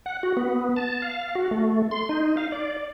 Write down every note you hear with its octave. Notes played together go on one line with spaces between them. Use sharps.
F#5
F#4
B3
A5
F5
F#4
A3
C6
D#4
F5
D5